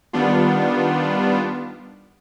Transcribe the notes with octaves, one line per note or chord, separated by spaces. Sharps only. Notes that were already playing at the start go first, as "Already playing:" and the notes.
D#3 G3 B3 D4 F4